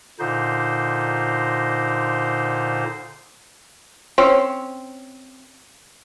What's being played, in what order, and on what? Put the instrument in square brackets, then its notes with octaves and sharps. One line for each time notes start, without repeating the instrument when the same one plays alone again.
[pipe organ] A#2 D3 D#4 C5
[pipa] C4 C#4